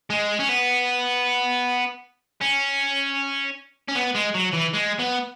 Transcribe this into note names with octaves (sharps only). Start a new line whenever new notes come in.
G#3
C#4
B3
C#4
C#4
B3
G#3
F#3
E3
G#3
B3